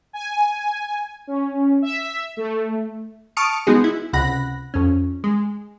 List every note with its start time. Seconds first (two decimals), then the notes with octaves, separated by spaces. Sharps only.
0.13 G#5
1.27 C#4
1.82 E5
2.37 A3
3.37 A5 C#6 D#6 F6 C#7 D7
3.67 G#3 B3 D#4 F#4 G#4
3.84 E4
4.13 C#2 C3 F#5 B5 F#6 A#6
4.74 F2 C#4
5.24 G#3